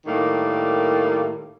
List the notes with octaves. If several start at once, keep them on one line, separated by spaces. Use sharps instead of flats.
A2 D#3 G3 A#3